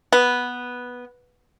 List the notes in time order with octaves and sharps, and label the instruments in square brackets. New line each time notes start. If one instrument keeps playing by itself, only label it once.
[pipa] B3